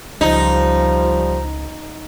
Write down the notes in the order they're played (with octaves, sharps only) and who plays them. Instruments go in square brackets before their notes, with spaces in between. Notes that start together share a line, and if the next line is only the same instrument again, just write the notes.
[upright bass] C#2 [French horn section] F3 G3 [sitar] D#4